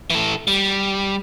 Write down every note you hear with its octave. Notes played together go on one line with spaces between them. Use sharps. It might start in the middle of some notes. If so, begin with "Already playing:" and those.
E3 A4
G3